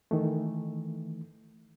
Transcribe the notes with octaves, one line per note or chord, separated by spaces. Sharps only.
D#3 E3 A3